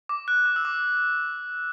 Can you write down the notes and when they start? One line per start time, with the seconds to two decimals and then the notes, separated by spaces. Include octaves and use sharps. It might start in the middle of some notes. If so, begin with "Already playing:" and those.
0.09 D6
0.28 F#6
0.45 D6
0.56 E6
0.65 D6